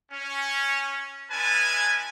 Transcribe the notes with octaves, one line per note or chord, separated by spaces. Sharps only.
C#4
G#3 C#4 E4 B4 G#5 A5